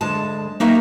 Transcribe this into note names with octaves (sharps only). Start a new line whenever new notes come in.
D2 G#3 A5
A#3 D#4 F#4 A#4 E5